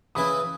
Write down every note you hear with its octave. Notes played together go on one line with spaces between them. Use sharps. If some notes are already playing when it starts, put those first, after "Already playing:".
C#3 E3 B3 E4 B4 B5 D#6